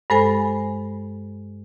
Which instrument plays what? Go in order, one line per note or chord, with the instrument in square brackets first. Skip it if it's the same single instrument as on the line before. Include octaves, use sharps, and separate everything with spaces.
[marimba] G2 G#3 A4 C5 G#5 B5